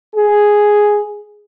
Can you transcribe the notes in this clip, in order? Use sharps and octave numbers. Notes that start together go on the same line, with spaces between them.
G#4